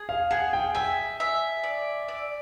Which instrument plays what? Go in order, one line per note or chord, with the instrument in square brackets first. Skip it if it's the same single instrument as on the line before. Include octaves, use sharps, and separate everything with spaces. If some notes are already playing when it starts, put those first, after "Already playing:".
Already playing: [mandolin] G#4
[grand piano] F5
[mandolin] G#4 [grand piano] F#5
[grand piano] G5
[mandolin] E5 [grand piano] G#5
[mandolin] E5
D5
D5